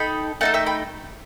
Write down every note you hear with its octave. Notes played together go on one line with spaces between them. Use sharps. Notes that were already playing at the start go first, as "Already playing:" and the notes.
Already playing: D#4 A4 G5 B5
A3 D#4 A4 F#5 A5
E5 G5
G5 B5